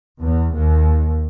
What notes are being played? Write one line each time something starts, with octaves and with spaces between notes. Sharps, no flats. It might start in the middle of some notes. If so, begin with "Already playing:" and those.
E2
D#2